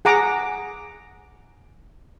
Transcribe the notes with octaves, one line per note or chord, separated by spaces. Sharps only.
G#4 F#5 A#5 D6